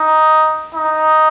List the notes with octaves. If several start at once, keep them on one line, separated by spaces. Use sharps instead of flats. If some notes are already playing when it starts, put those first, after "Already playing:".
Already playing: D#4
D#4